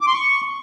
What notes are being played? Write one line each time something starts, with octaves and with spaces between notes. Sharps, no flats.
D6
C6
C#6